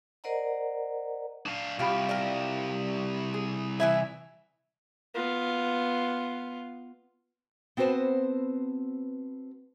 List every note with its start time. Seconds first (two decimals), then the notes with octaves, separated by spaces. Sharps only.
0.24 A#4 C5 D5 D#5 F#5 A#5
1.46 D4 F5
1.79 C2 F4 G4 B5
2.09 G3 A#4
3.34 G#4
3.80 E3 E4 E5 G#5
5.15 B3 F4
7.77 B3 C4 F#4 B4 C5 A5